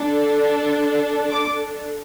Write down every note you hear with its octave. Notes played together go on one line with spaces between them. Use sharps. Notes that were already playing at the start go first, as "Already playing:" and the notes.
Already playing: D4 A4
D6